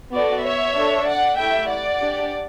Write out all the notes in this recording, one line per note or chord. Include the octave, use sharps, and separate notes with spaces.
B3 F#4 A4 D5
C#5 E5
D4 A4
D5 F#5
A3 E4 G4 E5 G5
D5 F#5
D4 G4